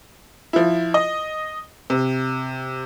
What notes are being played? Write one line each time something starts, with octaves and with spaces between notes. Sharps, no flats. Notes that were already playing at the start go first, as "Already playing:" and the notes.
F3 E4
D#5
C3